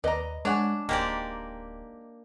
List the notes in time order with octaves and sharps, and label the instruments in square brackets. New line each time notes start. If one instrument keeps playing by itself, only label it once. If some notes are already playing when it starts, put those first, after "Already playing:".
[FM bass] D#2 [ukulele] B4 D#5 [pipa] D5 A#5
[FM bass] G#3 [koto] D4 [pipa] C#5 F#5 G#5
[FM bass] D1 [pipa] D#3 G#3 C5 [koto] A#3 G4 D5